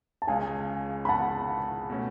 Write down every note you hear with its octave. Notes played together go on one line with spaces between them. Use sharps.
A5
C#2 C#3 G#3 F5 G#5
B5
F#5 A5
B2 A3 C#4